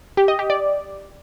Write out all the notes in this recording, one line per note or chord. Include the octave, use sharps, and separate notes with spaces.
G4
D#5
G4
D5